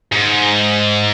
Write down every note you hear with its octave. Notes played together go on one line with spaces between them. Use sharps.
G#2